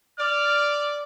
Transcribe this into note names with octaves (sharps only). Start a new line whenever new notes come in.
D5 F6